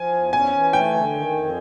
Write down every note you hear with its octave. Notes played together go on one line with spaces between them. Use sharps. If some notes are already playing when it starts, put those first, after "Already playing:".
Already playing: F3 G#5
E2
C#4 G#5
E3
A3 G5
D3
D#3
F2